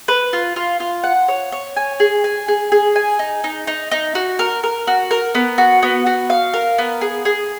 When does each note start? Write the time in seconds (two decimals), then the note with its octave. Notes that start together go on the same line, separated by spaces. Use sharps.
0.08 B4
0.33 F4
0.56 F4
0.80 F4
1.04 F#5
1.28 C#5
1.52 C#5
1.77 G#5
2.00 G#4
2.24 G#5
2.48 G#4
2.72 G#4
2.96 G#5
3.19 D#4
3.44 D#4
3.67 D#4
3.91 D#4
4.15 F#4
4.39 A#4
4.63 A#4
4.87 F#4
5.11 A#4
5.35 B3
5.58 F#4
5.83 B3
6.06 F#4
6.30 F5
6.54 A#4
6.78 B3
7.01 G#4
7.25 G#4